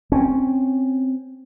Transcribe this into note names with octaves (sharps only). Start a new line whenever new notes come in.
C4 C#4